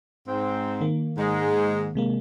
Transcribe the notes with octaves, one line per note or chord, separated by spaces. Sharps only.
G#2 C4
D#3 A#3
G#2 G#3
C3 G#3 A#3